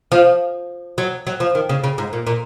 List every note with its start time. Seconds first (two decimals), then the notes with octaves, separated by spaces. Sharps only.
0.12 F3
0.98 F#3
1.27 F#3
1.40 F3
1.55 D#3
1.69 C#3
1.84 C#3
1.98 G#2
2.13 A#2
2.27 A#2